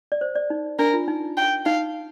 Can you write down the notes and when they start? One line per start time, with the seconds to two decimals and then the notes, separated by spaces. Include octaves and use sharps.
0.12 D5
0.21 C5
0.36 D5
0.50 D#4
0.79 D4 A#4
0.94 F4
1.08 D#4
1.37 G5
1.66 D#4 F5